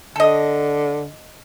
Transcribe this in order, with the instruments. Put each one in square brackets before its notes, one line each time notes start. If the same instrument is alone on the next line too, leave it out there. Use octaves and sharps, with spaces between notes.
[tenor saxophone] D3 [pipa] A4 D#5